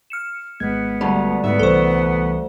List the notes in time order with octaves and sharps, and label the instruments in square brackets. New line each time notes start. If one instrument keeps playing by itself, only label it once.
[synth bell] F6 C#7 E7
[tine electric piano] G#1 G#3 G#6 [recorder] B3
[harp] D2 G2 [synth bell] G4
[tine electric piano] G#2 [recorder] B3 [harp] E5
[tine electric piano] C2 E3 C#6 [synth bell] A4 C5